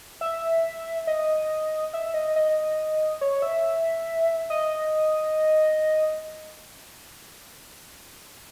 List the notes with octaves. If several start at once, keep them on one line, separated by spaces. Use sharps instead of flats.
E5
D#5
E5
D#5
D#5
C#5
E5
D#5